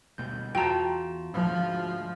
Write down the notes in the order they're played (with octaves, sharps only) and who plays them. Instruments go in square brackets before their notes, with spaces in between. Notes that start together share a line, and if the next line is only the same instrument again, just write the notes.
[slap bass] D2 B2 G3 [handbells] G6
[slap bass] E2 [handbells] F4 F#4 A5 [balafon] G5 A#5
[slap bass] D2 G#2 [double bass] F3